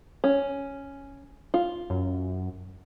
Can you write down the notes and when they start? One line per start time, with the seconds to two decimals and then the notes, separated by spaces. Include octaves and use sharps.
0.24 C#4
1.54 F4
1.90 F#2